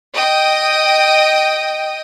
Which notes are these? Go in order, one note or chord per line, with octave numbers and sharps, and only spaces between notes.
D#5 G5 D#6